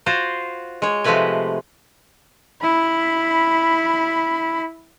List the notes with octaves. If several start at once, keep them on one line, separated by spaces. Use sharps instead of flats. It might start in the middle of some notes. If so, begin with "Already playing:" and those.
F4 F#4 C5
G#3 C#5
C3 F3 G#3 A3 B4 G#5
E4 B5